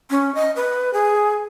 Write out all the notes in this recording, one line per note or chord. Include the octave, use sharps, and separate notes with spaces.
C#4
D#5
B4
G#4